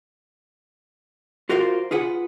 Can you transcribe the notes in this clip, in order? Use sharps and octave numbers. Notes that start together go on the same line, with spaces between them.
F4 F#4 A#4 C5 D5 F5
F4 G#4 B4 F#5